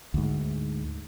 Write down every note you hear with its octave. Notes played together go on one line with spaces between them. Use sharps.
D2 G#2